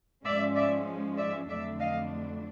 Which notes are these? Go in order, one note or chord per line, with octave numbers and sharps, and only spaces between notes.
G#2 F3 G#3 C#4 D5 E5
D5 E5
D5 E5
F2 D3 F#3 A3 D4 D5 E5
D#5 F5